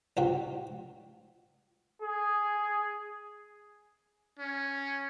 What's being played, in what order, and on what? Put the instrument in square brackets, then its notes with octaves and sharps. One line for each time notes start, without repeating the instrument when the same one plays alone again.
[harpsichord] C2 G2 F4 F#4 C5 G5
[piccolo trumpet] G#4
[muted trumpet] C#4